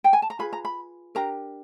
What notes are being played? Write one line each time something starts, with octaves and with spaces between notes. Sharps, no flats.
G5
G#5
A5
A#5
F4 G#4 B4 B5
A#5
B5
D4 G4 A#4 A#5